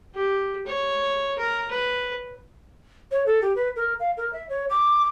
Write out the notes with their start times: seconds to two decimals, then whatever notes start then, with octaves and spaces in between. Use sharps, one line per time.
0.15 G4
0.66 C#5
1.38 A#4
1.70 B4
3.11 C#5
3.26 A4
3.42 G4
3.56 B4
3.76 A#4
4.00 F5
4.17 A#4
4.33 E5
4.49 C#5
4.70 D6